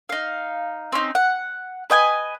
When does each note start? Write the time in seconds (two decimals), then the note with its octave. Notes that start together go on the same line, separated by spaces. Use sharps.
0.09 D#4 F5
0.92 C4 C#4 D#4
1.15 F#5
1.90 B4 D#5 G5 G#5